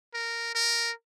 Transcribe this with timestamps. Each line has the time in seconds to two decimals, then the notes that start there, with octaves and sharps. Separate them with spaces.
0.14 A#4
0.55 A#4